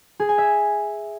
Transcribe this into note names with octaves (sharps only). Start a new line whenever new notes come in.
G#4
G#5
E5